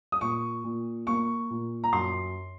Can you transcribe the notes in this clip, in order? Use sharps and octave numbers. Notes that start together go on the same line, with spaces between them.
D#6
A#2 C#6
A#2
A#3 C#6
A#2
A#5
F#2 C6